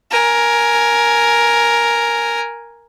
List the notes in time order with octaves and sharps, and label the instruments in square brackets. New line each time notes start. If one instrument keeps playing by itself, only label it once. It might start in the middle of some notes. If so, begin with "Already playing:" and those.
[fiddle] A#4 G#5